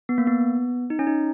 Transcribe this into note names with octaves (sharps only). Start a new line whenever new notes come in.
B3
A#3
B3
D#4
C#4
D#4